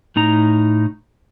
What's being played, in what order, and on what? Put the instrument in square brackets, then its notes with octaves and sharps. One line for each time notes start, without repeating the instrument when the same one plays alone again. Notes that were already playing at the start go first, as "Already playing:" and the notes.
[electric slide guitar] A2 D#4 A#5